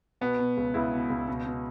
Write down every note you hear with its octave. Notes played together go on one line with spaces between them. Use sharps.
B2 B3
B2
C#2
C#2 E4
B2
C#2
B2
B2